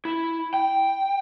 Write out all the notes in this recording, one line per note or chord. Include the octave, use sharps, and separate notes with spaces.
E4
G5